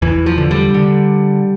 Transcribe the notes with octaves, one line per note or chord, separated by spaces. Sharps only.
E2 E3
F3
D3
G3
D3